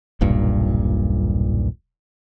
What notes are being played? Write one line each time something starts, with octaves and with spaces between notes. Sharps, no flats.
D#1 B1 G2 A#2